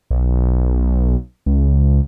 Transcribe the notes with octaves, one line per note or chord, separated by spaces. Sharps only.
B1
C#2